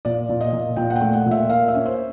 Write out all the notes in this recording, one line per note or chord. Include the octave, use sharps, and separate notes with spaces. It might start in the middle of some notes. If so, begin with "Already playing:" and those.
A#2 D5
A#2
D#5
A#2
A#2 G5
F#5
G5
A3
F#5
A#2
E5
A#3 F5
E5
C#4
C5